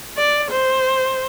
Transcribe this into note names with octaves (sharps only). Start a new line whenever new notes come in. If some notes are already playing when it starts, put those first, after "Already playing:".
D5
C5